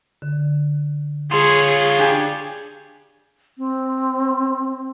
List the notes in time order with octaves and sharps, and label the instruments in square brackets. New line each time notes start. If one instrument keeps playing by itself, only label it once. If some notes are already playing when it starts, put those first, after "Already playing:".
[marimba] D3
[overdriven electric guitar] F4 C#5 [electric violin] G#4 [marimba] C6
[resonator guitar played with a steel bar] D4 G4 G#4
[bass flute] C4